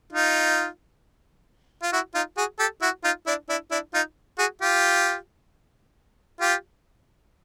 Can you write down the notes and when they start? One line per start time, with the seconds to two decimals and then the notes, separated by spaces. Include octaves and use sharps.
0.13 D#4 F4
1.83 F4
1.93 E4 F#4
2.14 D#4 F4
2.37 F#4 G#4
2.59 G4 A4
2.81 E4 F#4
3.04 D#4 F4
3.26 D4 E4
3.49 D4 E4
3.71 D4 E4
3.94 D#4 F4
4.38 F#4 G#4
4.62 F4 G4
6.40 F4 G4